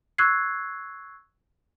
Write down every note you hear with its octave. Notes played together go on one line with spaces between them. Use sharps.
C#6 E6 F#6 G#6 C7